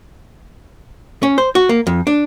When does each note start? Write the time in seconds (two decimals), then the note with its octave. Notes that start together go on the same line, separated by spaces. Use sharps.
1.23 C#4
1.38 C5
1.55 F#4
1.69 A#3
1.87 F2
2.07 D4